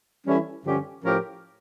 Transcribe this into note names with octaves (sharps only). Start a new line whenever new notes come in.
E3 G3 C#4 E4 A4
G2 D3 F3 C#4 G4
A2 F3 C#4 G4 A#4